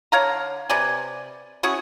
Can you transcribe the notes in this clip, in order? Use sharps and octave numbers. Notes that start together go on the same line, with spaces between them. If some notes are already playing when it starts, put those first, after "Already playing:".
D3 C#5 F5 A#5
C3 B4 D5 G#5
C#4 E4 F#4 G#4